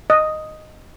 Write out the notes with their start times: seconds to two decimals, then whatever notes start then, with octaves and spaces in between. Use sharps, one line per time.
0.10 D#5